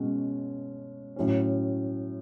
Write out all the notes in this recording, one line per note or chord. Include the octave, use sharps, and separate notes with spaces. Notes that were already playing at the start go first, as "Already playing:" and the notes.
Already playing: B2 G#3 C#4
A2 F#3 C#4